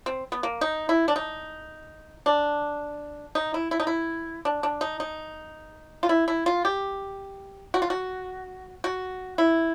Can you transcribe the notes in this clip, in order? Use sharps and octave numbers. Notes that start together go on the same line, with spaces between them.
C4
B3
A#3
D#4
E4
D4
D#4
D4
D#4
E4
E4
D#4
E4
D4
D4
D#4
D#4
F4
E4
E4
F4
G4
F#4
F4
F#4
F#4
E4